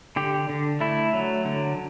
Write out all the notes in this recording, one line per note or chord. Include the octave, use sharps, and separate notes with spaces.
D3 G4
D3
A3 E4
F#3
D3